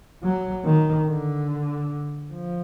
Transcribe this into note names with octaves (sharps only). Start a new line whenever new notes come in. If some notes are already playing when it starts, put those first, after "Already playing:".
F#3
D#3
D3
F3